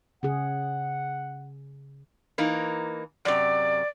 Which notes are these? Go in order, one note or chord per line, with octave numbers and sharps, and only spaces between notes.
C#3 G#4 F#5
E3 A#3 D#4
F#2 C3 D5